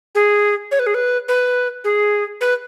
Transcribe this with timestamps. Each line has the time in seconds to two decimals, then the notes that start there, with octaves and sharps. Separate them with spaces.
0.15 G#4
0.71 C#5
0.79 B4
0.86 G#4
0.94 B4
1.28 B4
1.84 G#4
2.41 B4